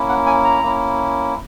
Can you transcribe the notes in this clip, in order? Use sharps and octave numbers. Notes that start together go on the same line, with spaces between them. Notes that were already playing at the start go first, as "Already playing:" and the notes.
Already playing: A#3 C#4 E4
F#5
G#5
A#5
A#3 C#4 E4